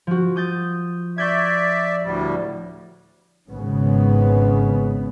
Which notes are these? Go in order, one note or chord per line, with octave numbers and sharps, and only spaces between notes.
F3 F#4
D#6 G6 A6
D5 E5 C#6 G6 G#6
D2 A2 G3
G#1 G#2 C#3 B3